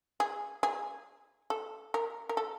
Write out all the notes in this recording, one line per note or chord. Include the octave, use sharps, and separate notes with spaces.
G#4
G#4
A4
A#4
A#4
A4